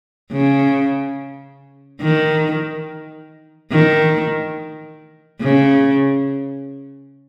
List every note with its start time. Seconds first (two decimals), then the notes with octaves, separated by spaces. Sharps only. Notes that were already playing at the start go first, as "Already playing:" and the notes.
0.32 C#3
2.02 D#3
3.71 D#3
5.41 C#3